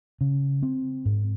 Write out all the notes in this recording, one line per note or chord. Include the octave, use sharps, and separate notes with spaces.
C#3
C4
G#2